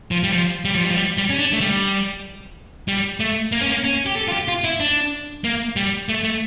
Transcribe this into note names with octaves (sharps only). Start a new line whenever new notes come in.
F3
G3
F3
G3
F3
G3
F3
G3
G3
C#4
D4
A3
G3
G3
A3
A#3
C#4
A#3
C#4
G4
A4
F4
G4
F4
E4
D4
A#3
G3
A3
A3